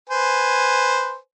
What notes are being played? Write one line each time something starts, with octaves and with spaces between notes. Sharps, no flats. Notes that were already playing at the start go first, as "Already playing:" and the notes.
B4 C5 G#5